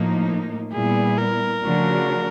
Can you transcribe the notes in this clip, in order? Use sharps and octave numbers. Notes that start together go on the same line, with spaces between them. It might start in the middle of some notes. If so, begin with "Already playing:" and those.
Already playing: A2 F3 A#3 D#4
A#2 G3 B3 E4 G#4
A#4
C#3 F3 A3 D4 F#4